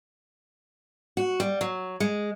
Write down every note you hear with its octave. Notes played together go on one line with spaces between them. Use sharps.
F#4
G3
F#3
G#3